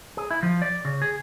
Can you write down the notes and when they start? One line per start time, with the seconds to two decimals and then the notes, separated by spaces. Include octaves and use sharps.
0.17 G#4
0.31 E4
0.43 F3
0.62 D5
0.85 C#3
1.02 G#4